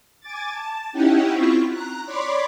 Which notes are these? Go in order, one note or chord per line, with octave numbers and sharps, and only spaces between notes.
G#5 D6 A6
A5
C#4 D#4 E4 G4 F#5 G5
C4 E4 F4 C#6 B6
A#5 F#6
C#5 D5 B5 C6 D6